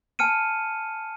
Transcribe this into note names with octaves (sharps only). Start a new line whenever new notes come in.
G#5 A5 F6 C#7 D#7